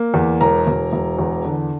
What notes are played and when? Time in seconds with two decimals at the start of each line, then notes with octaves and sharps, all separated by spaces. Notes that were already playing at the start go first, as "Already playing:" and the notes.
Already playing: A#3
0.14 E2
0.41 E1 A#4 A#5
0.67 E1
0.93 E1
1.18 E2
1.45 D3